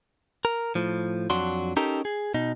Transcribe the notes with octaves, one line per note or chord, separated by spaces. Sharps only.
A#4
A2 F3
F2 F#3 D4 F#4 C6
C#4 D#4 G4 A4 A#4 A#5
G#4
B2 D#4